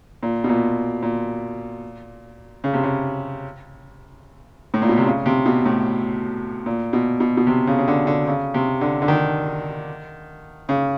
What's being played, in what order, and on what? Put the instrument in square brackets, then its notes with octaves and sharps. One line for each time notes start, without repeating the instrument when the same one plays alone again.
[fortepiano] A#2
B2
A#2
A#2
C#3
C3
C#3
A2
A#2
B2
C3
C#3
C3
B2
A2
A#2
B2
B2
B2
C3
C#3
C#3
D3
D3
C#3
C3
D3
D3
D#3
C#3